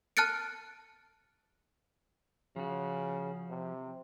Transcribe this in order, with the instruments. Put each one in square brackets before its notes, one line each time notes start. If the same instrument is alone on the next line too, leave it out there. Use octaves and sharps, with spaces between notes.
[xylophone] A5 F6 F#6 A6 C#7 D7
[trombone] C#3 [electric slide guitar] F3 F#4
[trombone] C3